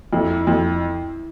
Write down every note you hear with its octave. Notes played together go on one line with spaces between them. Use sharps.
F2 E4
F2